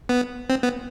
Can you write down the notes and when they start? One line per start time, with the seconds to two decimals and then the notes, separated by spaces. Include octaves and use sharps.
0.09 B3
0.50 C4
0.63 B3